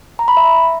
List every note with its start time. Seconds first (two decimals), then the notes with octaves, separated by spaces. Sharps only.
0.19 A#5
0.28 B5
0.37 E5